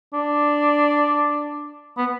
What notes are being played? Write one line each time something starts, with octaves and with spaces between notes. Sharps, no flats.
D4
B3